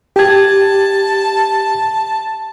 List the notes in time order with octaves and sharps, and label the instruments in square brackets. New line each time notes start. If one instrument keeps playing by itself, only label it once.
[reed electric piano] G4 G#6 [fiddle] A5